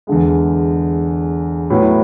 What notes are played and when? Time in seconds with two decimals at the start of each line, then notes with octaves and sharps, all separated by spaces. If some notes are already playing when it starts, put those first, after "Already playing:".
0.07 E2 D3 G#3
1.70 A2 F#3 B3 E4